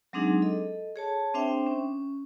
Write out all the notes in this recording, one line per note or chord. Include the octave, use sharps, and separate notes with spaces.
F#3 G#3 C4 D4 D#4 G#4
A4 D#5
G#4 C#5 A5
C4 D4 C5 E5 G5
C#4